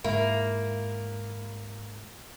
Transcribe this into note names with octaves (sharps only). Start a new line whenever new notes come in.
G#2 A#3 E4 F5